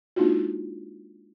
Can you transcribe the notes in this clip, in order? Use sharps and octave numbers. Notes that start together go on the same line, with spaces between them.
G#3 A#3 D4 D#4 F4 F#4